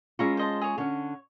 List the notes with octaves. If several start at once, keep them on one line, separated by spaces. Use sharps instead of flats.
G#3 C#4 E4 F4 A#5 C#6
C5 D#5 A5
G#4 C#5
D3 C#4 C#5